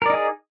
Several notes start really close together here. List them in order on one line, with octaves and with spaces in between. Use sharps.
A#4 D5 D#4 G#4